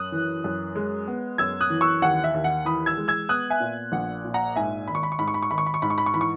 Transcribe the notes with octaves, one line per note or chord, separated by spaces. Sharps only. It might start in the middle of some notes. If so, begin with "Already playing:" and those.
Already playing: F#2 D#6 F#6
E3
F#2
G#3
B3
F#2 E6 G#6
D#6 F#6
E3
C#6 E6
D#2 F#5
E5
D#2
F#5
E3 B5 D#6
E6 G#6
G#3
E6 G#6
B3 D#6 F#6
E5 G#5
A#2
A#1 F#5
A#2
F#5 A#5
G#2 E5 G#5
G#1 B5
C#6
B5
C#6
G#2 B5
C#6
B5
C#6
G#1 B5
C#6
B5
C#6
G#2 B5
C#6
B5
C#6
E3 B5
C#6